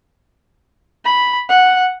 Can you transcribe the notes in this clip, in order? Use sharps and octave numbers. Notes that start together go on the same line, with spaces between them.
B5
F#5